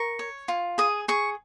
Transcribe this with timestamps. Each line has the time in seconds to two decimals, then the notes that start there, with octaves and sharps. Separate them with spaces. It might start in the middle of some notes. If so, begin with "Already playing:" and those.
Already playing: A#4 C#6
0.19 C#5
0.48 F4
0.78 G#4 D#6
1.08 G#4 C#6